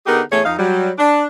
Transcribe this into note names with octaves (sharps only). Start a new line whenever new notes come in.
D3 B3 D#4 G4 G#4 A#4
E2 A3 G#4 C#5
F2 D#4 F5
F#3 G3
D4